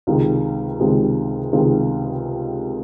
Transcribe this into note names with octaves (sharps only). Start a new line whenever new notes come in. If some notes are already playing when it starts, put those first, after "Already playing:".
C#2 C3 D#3 G#3
C#2 C3 D#3 G#3
C#2 C3 D#3 G#3